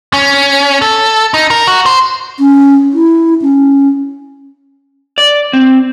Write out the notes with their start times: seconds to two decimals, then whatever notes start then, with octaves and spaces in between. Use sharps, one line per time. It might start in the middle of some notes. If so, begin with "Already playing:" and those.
0.13 C#4
0.82 A4
1.34 D#4
1.50 A#4
1.67 F#4
1.86 C5
2.40 C#4
2.94 E4
3.42 C#4
5.18 D5
5.53 C4